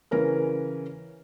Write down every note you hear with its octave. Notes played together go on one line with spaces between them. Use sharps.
C#3 E3 C#4 A#4 B4